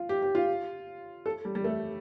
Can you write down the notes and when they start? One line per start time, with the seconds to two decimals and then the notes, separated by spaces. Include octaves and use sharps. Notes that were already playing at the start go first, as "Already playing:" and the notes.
Already playing: F4
0.09 G4
0.22 G4
0.35 F4
1.26 A4
1.45 G3
1.55 G3
1.64 A3